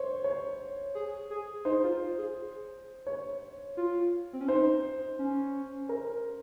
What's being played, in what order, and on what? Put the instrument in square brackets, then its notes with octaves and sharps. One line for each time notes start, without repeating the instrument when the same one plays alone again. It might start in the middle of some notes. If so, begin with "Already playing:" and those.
Already playing: [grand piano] C5 C#5
C#5
[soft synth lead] G#4
G#4
[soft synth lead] D#4 [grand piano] C5
[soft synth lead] F4
G#4
[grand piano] C#5
[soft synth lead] F4
C4
C#4
[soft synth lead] D#4 [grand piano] C5
[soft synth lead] C#4
[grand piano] A#4